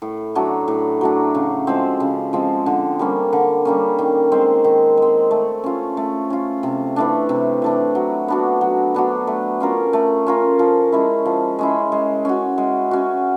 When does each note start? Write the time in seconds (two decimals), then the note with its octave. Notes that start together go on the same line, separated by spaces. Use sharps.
0.02 A2
0.35 F#3 A3 D4
0.68 A2
1.01 F#3 A3 D4
1.35 C#3
1.67 F3 G#3 C4
2.00 C#3
2.33 F3 G#3 C4
2.66 D3
2.99 G3 A#3 C#4
3.33 D3
3.65 G3 A#3 C#4
3.99 D#3
4.32 G#3 C4
4.64 D#3
4.97 G#3 C4
5.31 A3
5.64 C#4 F4
5.97 A3
6.30 C#4 F4
6.63 C3
6.96 E3 A3 D4
7.29 C3
7.62 E3 A3 D4
7.95 F#3
8.28 B3 D4 F#4
8.61 F#3
8.94 B3 D4 F#4
9.27 A3
9.60 C#4 F4 A#4
9.93 A3
10.27 C#4 F4 A#4
10.59 F3
10.92 G#3 C#4 E4
11.26 F3
11.59 G#3 C#4 E4
11.92 G#3
12.25 C#4 F#4
12.58 G#3
12.91 C#4 F#4